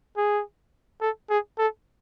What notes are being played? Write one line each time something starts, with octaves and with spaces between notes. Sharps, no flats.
G#4
A4
G#4
A4